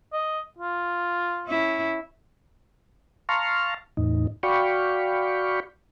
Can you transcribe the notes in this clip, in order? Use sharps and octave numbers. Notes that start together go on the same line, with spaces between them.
D#5
F4
C#4 E4
F5 A5 A#5 C6 C#6 F6
E2 A2 D#4
F#4 D5 F5 G5 B5 C#6